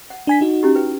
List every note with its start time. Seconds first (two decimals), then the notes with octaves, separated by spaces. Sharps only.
0.10 F#5
0.27 D4 G#5 B6
0.41 D#4 F#4
0.63 C#4 E4 G4
0.75 B4 G5